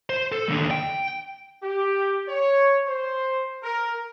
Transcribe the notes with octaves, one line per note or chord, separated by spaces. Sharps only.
C5
A4
D#2 D3
G5
G4
C#5
C5
A#4